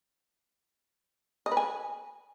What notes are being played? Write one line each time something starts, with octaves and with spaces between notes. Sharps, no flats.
D#5
B4
G#5